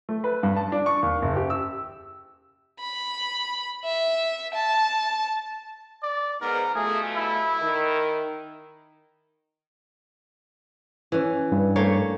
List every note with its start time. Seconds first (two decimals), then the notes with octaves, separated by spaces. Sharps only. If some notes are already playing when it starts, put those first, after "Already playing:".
0.09 A3
0.24 B4
0.43 G2
0.57 A5
0.72 D4
0.86 C#6
1.02 D#2
1.22 F#1
1.36 G4
1.50 E6
2.80 B5
3.85 E5
4.54 A5
6.03 D5
6.41 G#2 B3 A#4
6.75 B2 F3 A3 G#4
7.16 E4
7.62 D#3
11.12 E3 C#4
11.52 G2
11.76 A3 A#3 C#5